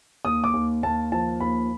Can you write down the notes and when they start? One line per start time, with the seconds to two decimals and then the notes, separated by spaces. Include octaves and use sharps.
0.25 D#2 D#6
0.44 D6
0.53 D#2
0.83 D#2 A5
1.12 F3 A5
1.40 D#2 B5